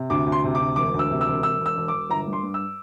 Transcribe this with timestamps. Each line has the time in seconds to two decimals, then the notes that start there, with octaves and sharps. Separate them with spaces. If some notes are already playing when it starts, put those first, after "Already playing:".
Already playing: C3
0.10 D2 D6
0.26 D2
0.32 C6
0.44 C3
0.55 D6
0.59 D2
0.76 E1 D6
0.94 D2
0.99 E6
1.11 C3
1.21 E6
1.27 E1
1.43 E1 E6
1.60 E1
1.66 E6
1.76 E1
1.88 D6
1.94 E1
2.10 G1 A#5
2.27 G2
2.33 C6
2.43 G2
2.54 E6